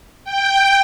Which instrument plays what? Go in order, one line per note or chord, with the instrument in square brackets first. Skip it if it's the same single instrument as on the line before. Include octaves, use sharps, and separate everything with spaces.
[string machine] G5